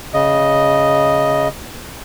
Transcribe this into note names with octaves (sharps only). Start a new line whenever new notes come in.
C#3 D#5